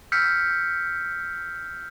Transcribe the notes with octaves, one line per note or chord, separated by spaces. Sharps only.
E6 F6 G6 B6 C#7